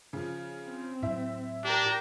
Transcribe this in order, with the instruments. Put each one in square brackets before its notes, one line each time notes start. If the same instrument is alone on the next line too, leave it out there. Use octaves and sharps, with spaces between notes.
[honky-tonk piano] C#3 F3
[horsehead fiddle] C4
[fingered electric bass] A2 F#3 [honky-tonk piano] E4 E5
[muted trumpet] D4 [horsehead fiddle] G4 A#4